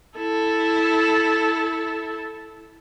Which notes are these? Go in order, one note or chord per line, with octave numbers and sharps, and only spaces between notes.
E4 A4